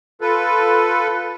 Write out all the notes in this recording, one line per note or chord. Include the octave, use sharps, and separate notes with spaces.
F4 A4 B4